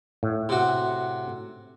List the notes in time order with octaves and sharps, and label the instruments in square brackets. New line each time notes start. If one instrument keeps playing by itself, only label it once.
[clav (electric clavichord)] A2
[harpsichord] C3 F#4